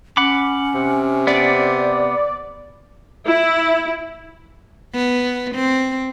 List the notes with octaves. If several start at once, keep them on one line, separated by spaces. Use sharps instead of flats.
C#4 F#5 B5 D6
C3
B3 D5
E4
B3
C4